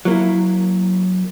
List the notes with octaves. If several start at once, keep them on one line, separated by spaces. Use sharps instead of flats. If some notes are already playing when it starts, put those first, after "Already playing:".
F#3 A#3 E4